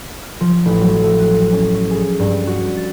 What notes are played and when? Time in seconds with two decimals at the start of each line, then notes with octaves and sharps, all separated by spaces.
0.23 F6
0.41 F3
0.65 A1
0.81 F#3
1.03 A3
1.19 F#6
1.53 C#4
1.91 G#4
2.20 G2
2.47 F#4
2.77 A6